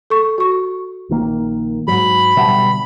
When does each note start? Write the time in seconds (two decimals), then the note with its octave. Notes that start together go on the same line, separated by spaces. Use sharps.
0.10 A4 C#6
0.38 F#4 C#6
1.09 A#1 D#3 A#3
1.88 G#2 F#3 B5
2.37 B2 D3 G3 E5 F#5 A5